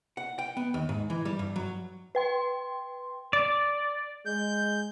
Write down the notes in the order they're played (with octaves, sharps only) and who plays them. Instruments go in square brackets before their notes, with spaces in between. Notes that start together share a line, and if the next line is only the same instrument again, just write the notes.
[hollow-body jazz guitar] F#5
G5
B3
D#2
G#2
E3
G3
G2
F#3
[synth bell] B4 G5 C6
[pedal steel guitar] D5
[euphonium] G#3 [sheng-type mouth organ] G6